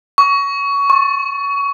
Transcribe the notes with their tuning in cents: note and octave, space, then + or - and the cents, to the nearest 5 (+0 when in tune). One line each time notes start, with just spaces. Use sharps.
C#6 +20
C#6 -35